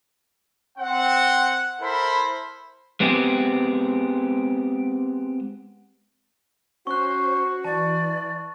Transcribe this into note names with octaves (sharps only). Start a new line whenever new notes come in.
C4 F#5
E4 A4 A#4 C5 B5
G#3 B3 C4 G4 G#4
C#4 F#4 C5 C#6 F#6
E3 D5 A5